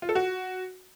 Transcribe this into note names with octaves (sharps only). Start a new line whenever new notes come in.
F4
A4
F#4